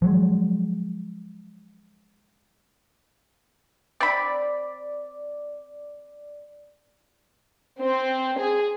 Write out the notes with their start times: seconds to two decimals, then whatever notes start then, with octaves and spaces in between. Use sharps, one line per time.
0.02 F3 F#3 G#3
4.00 C4 D5 B5
7.81 C4
8.39 G#4